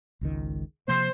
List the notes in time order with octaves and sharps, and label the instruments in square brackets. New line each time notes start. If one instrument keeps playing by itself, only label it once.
[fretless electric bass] G#1 C#2 D#3
[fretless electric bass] C3 F3 A#3 [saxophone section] C5